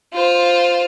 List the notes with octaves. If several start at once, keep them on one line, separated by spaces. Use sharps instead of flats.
F4 C5